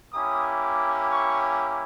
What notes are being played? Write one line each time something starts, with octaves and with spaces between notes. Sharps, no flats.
A#3 C#4 E4 G4 D#6
D6
C#6